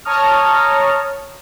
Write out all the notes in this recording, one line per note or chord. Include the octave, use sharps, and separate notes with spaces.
C#5 A5 A#5 C#6 D#6 F6